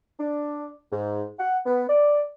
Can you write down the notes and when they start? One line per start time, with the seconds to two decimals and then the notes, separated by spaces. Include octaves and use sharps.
0.19 D4
0.92 G#2
1.39 F#5
1.66 B3
1.89 D5